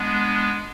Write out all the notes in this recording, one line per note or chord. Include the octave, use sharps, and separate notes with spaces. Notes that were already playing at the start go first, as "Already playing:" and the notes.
Already playing: G#3 B3 D4